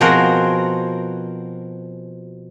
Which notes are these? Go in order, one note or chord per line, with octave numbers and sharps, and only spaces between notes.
B2 F3 C4 F#4 G#4 A#4